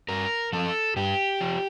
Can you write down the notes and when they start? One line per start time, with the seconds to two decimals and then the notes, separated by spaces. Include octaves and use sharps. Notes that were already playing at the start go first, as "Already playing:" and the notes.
0.09 G2 A#4
0.53 F3 A4
0.96 G2 G4
1.41 F3